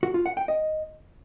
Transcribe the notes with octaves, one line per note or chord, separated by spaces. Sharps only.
F#4
F4
F#5
G5
D#5